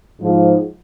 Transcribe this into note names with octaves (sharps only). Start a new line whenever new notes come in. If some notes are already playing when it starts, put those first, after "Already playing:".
G#2 F3